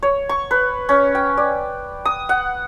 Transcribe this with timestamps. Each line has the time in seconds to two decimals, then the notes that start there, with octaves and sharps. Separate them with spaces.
0.03 C#5
0.29 C#6
0.51 B4
0.89 C#4
1.15 G5
1.37 D5
2.05 D#6
2.29 F#5